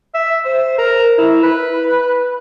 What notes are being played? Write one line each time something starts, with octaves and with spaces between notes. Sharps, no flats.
E5
C5
A#4
E4
B4